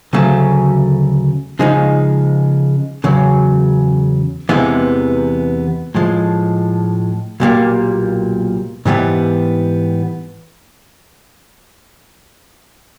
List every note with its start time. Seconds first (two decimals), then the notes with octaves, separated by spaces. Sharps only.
0.13 D2 C#3 F#3 A3 C#4
1.59 C#3 F3 G#3 C4 D#4
3.04 E2 C#3 F#3
4.49 E2 C3 E3 G#3 B3
5.95 A2 F3 G#3
7.40 B1 A#2 G3 A#3
8.85 G#2 E3 G3 B3